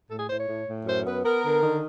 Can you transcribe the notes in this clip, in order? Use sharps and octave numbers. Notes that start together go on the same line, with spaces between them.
A2 A4
G#4
A2 C5
C#5
A2
A2
F#2 C5
B3 B4
B3 A#4
D3
D#3